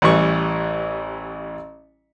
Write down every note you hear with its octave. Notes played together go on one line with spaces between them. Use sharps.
A1 E3 G3 C#6